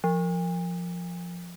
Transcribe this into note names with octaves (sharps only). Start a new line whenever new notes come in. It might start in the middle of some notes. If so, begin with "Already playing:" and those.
F3